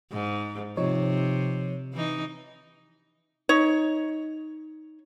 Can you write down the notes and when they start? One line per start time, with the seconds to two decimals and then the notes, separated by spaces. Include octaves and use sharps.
0.11 G#2
0.77 C3 F3 D#4 C#5
1.94 E3 D#4
3.49 D#4 C#5